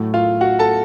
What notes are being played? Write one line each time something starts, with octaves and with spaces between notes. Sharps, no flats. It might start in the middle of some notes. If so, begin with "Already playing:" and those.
Already playing: A2 F#3 A3
F4 F5
F#4 F#5
A4 A5